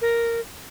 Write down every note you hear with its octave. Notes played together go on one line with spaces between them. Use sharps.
A#4